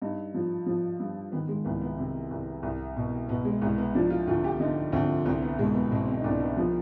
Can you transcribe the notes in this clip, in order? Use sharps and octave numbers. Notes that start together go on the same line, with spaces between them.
G2 D#4
F3
F3
G2
D#3 B3
G#3
C2 B3
B3
C3
C2
C2
B2
B2 B3
G#3
C2 G#3
B3
F3 D4
F4
D2 F4
G4
D3 D#4
D2 C4
C2 C4
B3
B2 G#3
B3
B2 C4
C4
D#4
C2 D4
B3
F3 B3